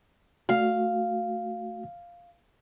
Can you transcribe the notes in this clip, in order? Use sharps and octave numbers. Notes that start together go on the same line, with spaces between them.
A3 F#4 F5